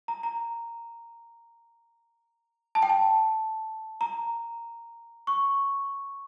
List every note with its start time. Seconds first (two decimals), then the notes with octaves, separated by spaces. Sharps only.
0.08 A#5
0.23 A#5
2.75 A5
2.83 G5
2.90 A5
4.01 A#5
5.27 C#6